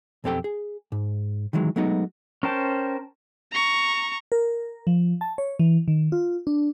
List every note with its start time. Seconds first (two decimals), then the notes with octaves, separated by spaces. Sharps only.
0.24 B1 F2 C4 G4 A4 G5
0.44 G#4
0.92 G#2
1.53 D#3 E3 F#3 G#3
1.76 F#3 G#3 A3 B3 D#4 F#4
2.43 C#4 A#4 C5 G5 A5
3.52 A#5 C#6
4.32 A#4
4.87 F3
5.21 A5
5.38 C#5
5.59 E3
5.88 D#3
6.12 F4
6.47 D4